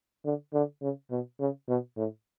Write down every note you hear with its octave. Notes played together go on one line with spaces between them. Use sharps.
D3
D3
C#3
B2
C#3
B2
A2